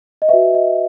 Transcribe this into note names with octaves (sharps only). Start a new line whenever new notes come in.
D#5
F#4 B4 E5
D#5